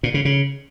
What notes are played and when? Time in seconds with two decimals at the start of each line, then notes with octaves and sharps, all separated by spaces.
0.03 A#2
0.14 C#3
0.25 C#3